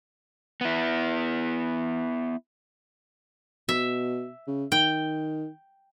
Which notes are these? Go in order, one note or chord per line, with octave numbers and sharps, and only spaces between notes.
B3 E4
B2 E5
C#3
D#3 G5